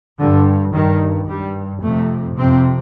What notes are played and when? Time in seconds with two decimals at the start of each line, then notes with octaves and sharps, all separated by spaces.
0.20 G2 D3
0.74 G2 D#3
1.28 G2 G3
1.83 F2 C3 A3
2.37 F2 C3 C4